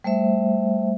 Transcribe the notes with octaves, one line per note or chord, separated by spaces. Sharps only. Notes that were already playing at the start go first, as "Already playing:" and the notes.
G3 A3 C5 E5